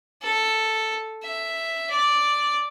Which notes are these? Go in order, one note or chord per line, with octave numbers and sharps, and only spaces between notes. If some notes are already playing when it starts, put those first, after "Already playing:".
A4
E5
D5